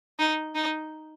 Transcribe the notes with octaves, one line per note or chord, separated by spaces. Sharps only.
D#4
D#4